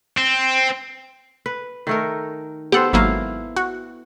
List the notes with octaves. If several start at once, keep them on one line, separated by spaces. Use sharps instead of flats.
C4
B4
D#3 A3 A#4
B3 G4 A4 C5 F#5
G#1 F#3 A#3 E4 F5
F#4